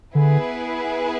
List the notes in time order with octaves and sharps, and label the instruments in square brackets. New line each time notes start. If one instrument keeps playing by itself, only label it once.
[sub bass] D3 [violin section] B3 E4 G#4 B4